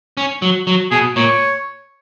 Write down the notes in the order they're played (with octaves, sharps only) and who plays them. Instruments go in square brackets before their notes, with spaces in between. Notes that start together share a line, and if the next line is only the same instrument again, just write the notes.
[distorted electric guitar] C#4
F#3
F#3
[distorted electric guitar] B2 [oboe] G#4
[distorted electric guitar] A#2 [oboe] C#5